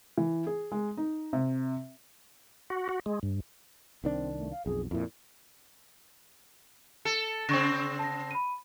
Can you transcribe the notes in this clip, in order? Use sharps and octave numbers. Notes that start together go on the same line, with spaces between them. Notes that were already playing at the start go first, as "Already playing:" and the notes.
E3
G#4
G#3
D#4
C3
F#4
F#4
G#3
G2
C2 D#3 C4 D4
A3
F5
B1 F2 G#4
F2 A#2 E4
A4 C#7
C#3 C4 C#6 A#6
A5 A#6
B5 D#7